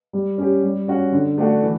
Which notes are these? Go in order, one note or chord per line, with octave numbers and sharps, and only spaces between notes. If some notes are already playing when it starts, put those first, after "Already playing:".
G3
C#4 G4
G3
C#4 F#4
D3
A3 D4 F#4
E3